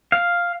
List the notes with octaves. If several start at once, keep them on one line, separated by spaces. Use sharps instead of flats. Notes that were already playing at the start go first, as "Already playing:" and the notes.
F5